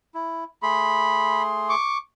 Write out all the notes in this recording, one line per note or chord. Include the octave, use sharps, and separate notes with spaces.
E4
A3 G#4 B5 C6
C#6 D6